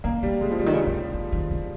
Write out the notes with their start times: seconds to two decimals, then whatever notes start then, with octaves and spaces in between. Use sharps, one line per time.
0.04 C#3 A#3
0.22 C#3 G3
0.41 D#3 G#3
0.51 F3
0.59 C#3 G3
0.66 D#3
0.73 C#3
0.87 C#3
1.14 D#3
1.33 D#3
1.51 C#3